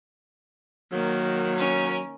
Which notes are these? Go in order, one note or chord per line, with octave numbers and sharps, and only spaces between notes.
D#3 F#3 A#3
C#4 A#4